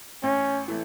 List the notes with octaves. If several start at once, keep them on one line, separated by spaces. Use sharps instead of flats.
A1 C#4
E3 A3